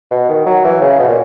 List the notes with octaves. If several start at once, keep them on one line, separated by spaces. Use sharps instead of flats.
B2
D#3
F#3
E3
C#3
B2
A#2